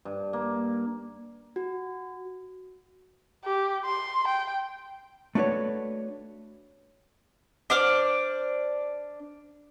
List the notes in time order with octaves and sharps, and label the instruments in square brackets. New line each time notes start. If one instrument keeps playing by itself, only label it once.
[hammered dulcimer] G2
A#3
[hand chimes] F#4
[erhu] G4
C6
G5
[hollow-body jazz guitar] A3 D4 F#4 B4 C#5
[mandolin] D4 C5 D6 F6